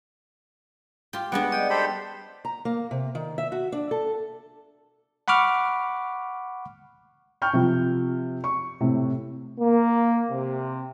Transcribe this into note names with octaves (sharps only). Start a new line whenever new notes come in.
F4 G4 G5
G3 G#3 B3 D4 F#5
D5 D#5 G5
G4 A4 C5 B5
A#5
A#3
C3
D#3
E5
F#4
D4
A4
F#5 B5 C#6 D6 F6
G5 C#6 F6 G6
C3 F3
C#6
A2 C3
A#3
C3